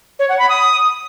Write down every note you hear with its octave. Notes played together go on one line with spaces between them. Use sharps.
C#5
F#5
B5
D#6